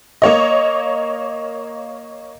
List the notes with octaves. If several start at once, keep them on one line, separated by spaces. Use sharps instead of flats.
A#3 C#5 D#5